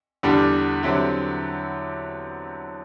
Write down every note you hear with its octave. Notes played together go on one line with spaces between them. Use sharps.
E2 D3 G3 D4 G4
D3 F#3 C4 E4 G4